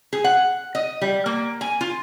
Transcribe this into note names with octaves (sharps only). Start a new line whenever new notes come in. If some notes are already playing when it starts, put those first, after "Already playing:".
G#4
F#5
D#5
G3
A#3
G#5
F4